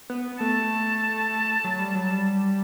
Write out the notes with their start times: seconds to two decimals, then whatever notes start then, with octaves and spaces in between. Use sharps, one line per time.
0.10 B3
0.40 A3 A5
1.64 F#3
1.80 G3
1.95 F#3
2.11 G3